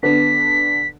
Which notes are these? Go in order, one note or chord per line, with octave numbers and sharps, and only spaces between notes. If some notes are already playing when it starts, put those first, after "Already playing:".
D3 B3 D4 B6